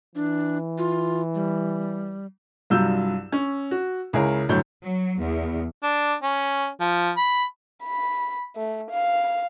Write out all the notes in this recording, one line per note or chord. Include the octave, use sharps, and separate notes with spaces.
E3 D4
F4
G3
C2 G2 F#3 F4 E6 G6
C#4
F#4
C#2 E4 G#4 A#4 C#5
G1 D2 A2 F#3 C#5 G6
F#3
E2
D4
C#4
F3
B5
B5
A3
F5